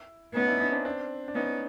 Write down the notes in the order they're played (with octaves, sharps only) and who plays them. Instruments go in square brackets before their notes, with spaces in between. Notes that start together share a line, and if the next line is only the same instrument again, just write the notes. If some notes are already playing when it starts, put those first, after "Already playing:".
Already playing: [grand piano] E4
[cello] B3 [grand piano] C#4 D#4
[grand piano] D4 E4
C#4 D#4
C4 D4
C4 D4
D4
[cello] B3 [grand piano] C#4 D#4